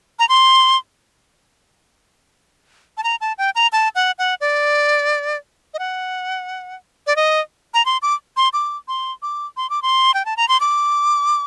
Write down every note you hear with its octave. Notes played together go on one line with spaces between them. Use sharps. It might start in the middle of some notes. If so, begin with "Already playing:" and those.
A#5
C6
A5
A#5
A5
G5
A#5
A5
F#5
F#5
D5
D#5
F#5
D5
D#5
A#5
C6
D6
C6
D6
C6
D6
C6
D6
C6
G5
A5
A#5
C6
D6